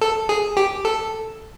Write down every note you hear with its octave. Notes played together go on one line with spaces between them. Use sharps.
A4
G#4
G4
A4